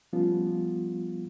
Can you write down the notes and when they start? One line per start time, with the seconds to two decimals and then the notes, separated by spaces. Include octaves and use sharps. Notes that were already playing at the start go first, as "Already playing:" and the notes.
0.13 F3 G3 B3 C#4 F4